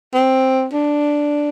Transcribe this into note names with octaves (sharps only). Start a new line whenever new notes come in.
C4
D4